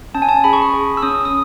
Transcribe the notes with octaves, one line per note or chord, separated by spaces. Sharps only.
C#4 A5
G#5
A5
G#4 B5
C#6
B5
G#4
E6
C#4 D#6
D#6